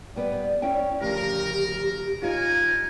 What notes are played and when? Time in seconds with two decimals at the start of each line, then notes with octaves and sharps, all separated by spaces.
0.16 G3 B3 B4 D5
0.62 C#4 E4 G5
1.01 D2 C#3 F3 G4 A#4
2.22 D#4 F4 A#4 C#5 G#5